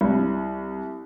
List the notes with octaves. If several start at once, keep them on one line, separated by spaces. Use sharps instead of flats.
C2